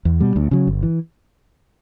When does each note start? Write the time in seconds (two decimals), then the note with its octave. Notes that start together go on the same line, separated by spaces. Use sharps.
0.05 E2
0.20 B2 G3
0.36 D2
0.51 C#3 F#3
0.67 G1
0.83 E3